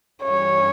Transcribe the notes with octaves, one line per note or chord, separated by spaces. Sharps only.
G2 E3 G3 C#4 C#5